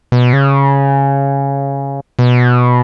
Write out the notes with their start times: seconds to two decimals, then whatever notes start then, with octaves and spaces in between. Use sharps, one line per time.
0.12 B2
0.33 C#3
2.19 B2